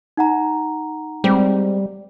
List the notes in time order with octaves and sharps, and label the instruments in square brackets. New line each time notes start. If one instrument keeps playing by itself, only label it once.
[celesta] D#4 F#5 A#5
[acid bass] G3 [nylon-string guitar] G#3 C4